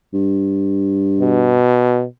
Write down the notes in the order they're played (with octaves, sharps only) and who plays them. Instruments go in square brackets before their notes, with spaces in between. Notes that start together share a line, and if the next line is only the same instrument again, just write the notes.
[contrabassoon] G2
[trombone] B2